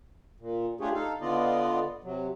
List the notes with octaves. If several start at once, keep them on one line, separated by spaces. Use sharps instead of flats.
A#2
A3 D4 F4 G4 G#4 C#5
D#4 A4 F5
D3 B3 F4 D5 D#5
C3 F#3